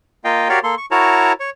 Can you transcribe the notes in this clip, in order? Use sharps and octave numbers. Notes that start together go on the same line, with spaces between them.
A#3 F4 D#5 F5 G5
F#4 G4 A#4 C#5 D5 F5
A#3 A4 C6
C#6
E4 F#4 A#4 C#5 A5 A#5
C#5